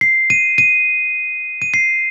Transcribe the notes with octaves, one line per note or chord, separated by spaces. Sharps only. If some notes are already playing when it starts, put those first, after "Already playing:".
C7
D#7
D#7
D#7
C7